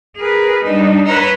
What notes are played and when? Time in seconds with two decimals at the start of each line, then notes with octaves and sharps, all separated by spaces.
0.17 G#4 A#4 B4
0.62 G3 D4 D#4
1.05 B4 C#5 F#5 A#5 C6 E6